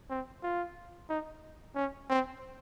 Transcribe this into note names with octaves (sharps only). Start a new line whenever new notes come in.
C4
F4
D#4
C#4
C4